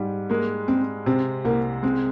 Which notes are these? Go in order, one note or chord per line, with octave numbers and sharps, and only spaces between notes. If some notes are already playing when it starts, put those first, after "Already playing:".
Already playing: G#2 G3
G#3 A#3
G#3 C4
C3 C4
C2 A#3
G#3 C4